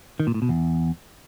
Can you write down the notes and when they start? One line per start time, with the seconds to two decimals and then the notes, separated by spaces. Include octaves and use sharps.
0.20 D#3
0.27 A#2
0.34 A2
0.42 B2
0.49 E2